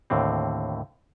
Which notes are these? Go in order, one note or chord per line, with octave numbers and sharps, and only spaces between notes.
D#2 A2 D3 C4